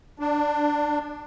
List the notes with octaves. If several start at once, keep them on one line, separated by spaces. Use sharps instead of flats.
D4